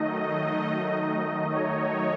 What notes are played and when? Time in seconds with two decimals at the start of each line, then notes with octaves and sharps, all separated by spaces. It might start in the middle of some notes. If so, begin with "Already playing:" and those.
Already playing: D#3 F#3 A3 D#4 D#5
1.52 C#5